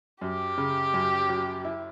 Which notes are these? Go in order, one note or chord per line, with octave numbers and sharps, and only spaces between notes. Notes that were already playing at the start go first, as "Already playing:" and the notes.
F#2 G4
C#3
F#2
F#3
E4